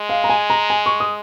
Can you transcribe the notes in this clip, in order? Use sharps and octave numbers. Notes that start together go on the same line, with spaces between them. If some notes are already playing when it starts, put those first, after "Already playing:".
Already playing: G#3
F5
A#5
G#5
A#5
G#5
C#6
D#6